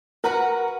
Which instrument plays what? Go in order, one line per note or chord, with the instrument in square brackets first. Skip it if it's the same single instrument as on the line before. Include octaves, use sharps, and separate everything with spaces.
[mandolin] F#4 B4 F#5 [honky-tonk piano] A#4